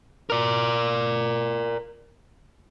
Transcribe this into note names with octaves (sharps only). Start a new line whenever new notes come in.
A#4 D5